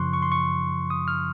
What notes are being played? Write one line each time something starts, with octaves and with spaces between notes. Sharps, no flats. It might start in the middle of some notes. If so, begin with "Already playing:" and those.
Already playing: F#2 C#3 F3 C6 C#6 F#6
C#6
C6
C#6
D#6
F6